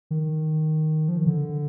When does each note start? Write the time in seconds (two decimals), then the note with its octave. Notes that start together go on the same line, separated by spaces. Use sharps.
0.11 D#3
1.08 F3
1.17 D#3
1.27 D3